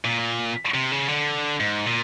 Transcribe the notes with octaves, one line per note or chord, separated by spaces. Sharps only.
A#2
C3
C#3
D3
G#2
A#2